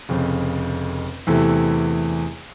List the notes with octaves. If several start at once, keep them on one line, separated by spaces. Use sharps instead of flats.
F1 F2 C#3
E2 C3 E3 A3